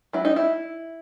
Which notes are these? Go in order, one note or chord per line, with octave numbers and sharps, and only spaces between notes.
F#3 E4
D4 D#4
E4